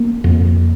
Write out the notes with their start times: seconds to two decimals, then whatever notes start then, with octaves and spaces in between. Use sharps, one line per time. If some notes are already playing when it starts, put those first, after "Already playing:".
Already playing: A#3
0.24 F2